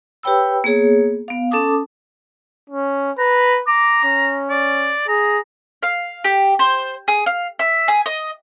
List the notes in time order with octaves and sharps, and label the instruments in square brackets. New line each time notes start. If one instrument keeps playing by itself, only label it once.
[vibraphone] G4 B4 C#5 G5 B5 E6
A#3 B3 G#4 C#5
B3 F5
C#4 A4 A5 D6 D#6
[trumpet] C#4
[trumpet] B4 [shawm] A#5
[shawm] A#5 [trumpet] D6
[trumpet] C#4
[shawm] D5
[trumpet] G#4 [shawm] A#5
[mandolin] F5
G4
C5
G#4
F5
E5
G#4
D#5